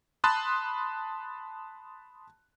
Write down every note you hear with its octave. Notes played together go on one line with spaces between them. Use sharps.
A5 B5 C6 D#6 F#6 A6